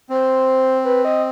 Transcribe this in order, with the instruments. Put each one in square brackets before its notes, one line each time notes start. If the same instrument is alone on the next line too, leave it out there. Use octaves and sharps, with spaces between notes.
[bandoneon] C4 [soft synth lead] C5
[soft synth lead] B4
D#5